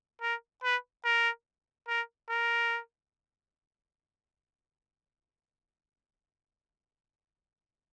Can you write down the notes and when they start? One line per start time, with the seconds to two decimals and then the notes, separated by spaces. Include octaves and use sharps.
0.22 A#4
0.63 B4
1.05 A#4
1.88 A#4
2.30 A#4